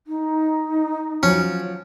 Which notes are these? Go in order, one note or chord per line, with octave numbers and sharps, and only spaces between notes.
D#4
F3 F#3 C#4